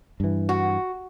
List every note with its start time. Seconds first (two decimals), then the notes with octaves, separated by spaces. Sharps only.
0.20 G2 E3
0.49 F#4